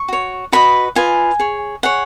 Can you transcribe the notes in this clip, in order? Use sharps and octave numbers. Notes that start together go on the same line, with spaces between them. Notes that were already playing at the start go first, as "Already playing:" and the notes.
Already playing: C#6
F#4 C#5
F#4 B4 D#5 B5
F4 B4 D#5 G#5
G#4 C#5
G#4 C#5 F#5